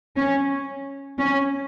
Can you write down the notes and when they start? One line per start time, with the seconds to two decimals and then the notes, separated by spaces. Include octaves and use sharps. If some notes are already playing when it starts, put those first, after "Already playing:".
0.17 C#4
1.19 C#4